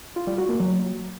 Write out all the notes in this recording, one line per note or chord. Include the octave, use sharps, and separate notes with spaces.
F4
G3
F#4
A#3
F#3